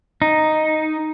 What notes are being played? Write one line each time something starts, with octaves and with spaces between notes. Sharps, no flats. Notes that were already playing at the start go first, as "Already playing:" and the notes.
D#4